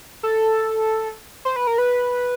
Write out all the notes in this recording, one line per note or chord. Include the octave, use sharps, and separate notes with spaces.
A4
C5
B4
A#4
B4